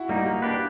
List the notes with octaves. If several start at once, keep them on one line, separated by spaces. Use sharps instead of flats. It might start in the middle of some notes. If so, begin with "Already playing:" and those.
Already playing: E4 F#4
G3 A#3 D#4
A#3
D4 G4 B4